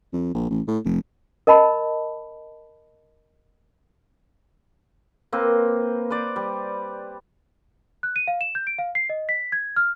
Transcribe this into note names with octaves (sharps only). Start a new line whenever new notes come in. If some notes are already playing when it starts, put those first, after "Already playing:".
F2
A#1
A1
A2
F1
A#4 D#5 A5 B5
A#3 C4 B4
B4 C5 D5
G3
F#6
D#7
F5
E7
G6
D7
F5
C7
D#5
B6
G#6
F6